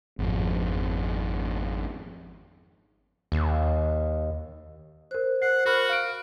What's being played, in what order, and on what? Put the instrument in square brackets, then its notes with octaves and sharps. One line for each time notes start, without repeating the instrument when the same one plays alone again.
[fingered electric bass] G#1 F2
[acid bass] D#2
[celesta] A#4 F#6 [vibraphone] C5
[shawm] F#5 [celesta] F#6 C7
[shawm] F#4 [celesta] A#4 B5 F6
[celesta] F5 F6 D7